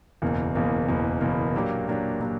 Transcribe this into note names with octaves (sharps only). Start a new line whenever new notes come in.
F#1 E2 B2 A#3
F#1 E2 B2 A#3
F#1 E2 B2 A#3
F#1 E2 B2 A#3
A#2 F#3 A#3 D4 G4
A#2 F#3 A#3 D4 G4
A#2 F#3 A#3 D4 G4